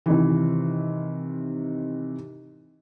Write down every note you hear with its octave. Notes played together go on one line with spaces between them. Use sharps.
C3 D#3 E3